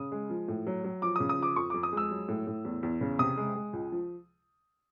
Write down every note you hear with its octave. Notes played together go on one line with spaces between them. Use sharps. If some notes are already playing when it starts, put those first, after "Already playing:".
Already playing: C#3 D#6
G#3
F3
A2
F#3
F#3
F3 D6
C#3 D#6
D#6
F3 D6
F2 C#6
F2 D6
D#6
G#3 E6
F#3
A2
A2
E2
E2
C#3
C3 D#6
G#3
G#3
C#2
F3